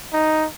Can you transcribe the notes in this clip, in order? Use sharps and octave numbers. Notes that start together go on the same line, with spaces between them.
D#4